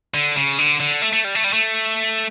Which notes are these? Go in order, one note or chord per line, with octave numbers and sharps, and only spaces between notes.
D3
C#3
D3
D3
A3
A3
G3
A3
G3
A3